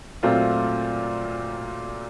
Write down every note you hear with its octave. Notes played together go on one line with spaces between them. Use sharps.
A#2 F#3 A3 C4 F4